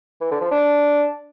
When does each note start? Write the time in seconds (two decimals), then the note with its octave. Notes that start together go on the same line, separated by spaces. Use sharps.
0.21 E3
0.31 D3
0.41 F3
0.51 D4